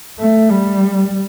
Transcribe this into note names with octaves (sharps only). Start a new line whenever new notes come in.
A3
G3